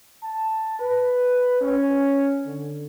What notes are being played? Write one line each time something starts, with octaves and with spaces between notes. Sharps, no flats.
A5
B4
C#4
D3